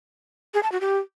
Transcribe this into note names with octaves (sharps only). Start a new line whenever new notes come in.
G#4
A5
F#4
G4